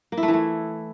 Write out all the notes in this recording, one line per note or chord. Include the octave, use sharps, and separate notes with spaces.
A#3
E4
A3
E3
A3